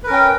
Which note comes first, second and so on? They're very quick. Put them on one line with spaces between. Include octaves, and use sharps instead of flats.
B4 A#4 C#4 G5